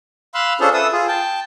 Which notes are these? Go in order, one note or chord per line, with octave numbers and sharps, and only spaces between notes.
F5 B5 C6 E6 F#6
C#4 D4 F4 G#4 A4 C5
A4 B4 E5 D#6 E6
F4 G#4
G5 A5